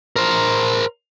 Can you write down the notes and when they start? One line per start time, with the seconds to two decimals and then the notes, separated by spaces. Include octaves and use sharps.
0.16 A#4 C5